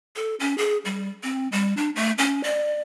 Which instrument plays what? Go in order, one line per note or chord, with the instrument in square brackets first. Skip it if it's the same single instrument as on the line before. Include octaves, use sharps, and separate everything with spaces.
[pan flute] A4
C#4
G#4
G3
C4
G3
D4
A3
C#4
D5